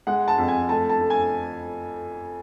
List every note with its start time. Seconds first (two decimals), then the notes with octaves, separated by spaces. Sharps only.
0.07 G#3 F#5
0.28 A5
0.38 F2
0.48 G#5
0.69 A3 A5
0.89 A5
1.00 A3
1.10 G#5